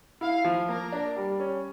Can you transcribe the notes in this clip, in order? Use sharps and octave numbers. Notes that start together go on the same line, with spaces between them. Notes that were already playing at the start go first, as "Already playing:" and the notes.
E4 F5
F3
A#3 A#4
D4
G3
C#4